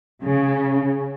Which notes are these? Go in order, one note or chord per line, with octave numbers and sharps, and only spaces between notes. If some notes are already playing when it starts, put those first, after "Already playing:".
C#3